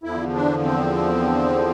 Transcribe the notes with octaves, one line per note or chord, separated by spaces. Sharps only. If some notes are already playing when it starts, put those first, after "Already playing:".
E2 D3 F3 E4
D4
C4